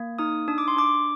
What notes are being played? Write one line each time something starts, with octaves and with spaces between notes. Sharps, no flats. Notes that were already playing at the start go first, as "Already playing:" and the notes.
Already playing: A#3
D#4 D#6
D4 D#6
D6
C6
D4 D6